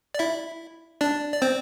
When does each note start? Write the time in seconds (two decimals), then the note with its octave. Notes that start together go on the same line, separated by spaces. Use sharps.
0.14 D5
0.19 E4 E5
1.01 D4 D5
1.32 D5
1.42 C4 C5